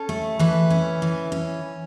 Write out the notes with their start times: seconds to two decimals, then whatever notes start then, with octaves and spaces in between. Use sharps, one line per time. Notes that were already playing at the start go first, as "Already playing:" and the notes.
Already playing: C#4 A4
0.09 A3
0.39 E3 B4
0.70 C#4
1.02 E3
1.32 C#4